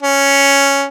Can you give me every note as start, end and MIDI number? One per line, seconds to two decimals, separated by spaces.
0.03 0.86 61